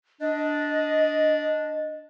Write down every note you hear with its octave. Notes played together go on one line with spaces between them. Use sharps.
D4 D#5